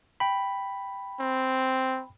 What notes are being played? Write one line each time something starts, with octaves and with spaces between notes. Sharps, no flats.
G5 B5
C4